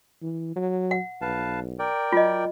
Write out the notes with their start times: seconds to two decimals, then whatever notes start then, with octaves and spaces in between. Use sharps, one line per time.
0.22 E3
0.56 F#3
0.91 F#5
1.21 B1 B4 F5 A5
1.79 A#4 D5 G5
2.12 F#3 F4 D#5